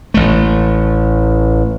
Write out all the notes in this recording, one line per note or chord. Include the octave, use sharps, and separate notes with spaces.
A1 A3